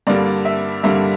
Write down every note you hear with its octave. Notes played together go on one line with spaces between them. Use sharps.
G2 D3 G3 A#3 D5
E5
G2 D3 G3 A#3 E5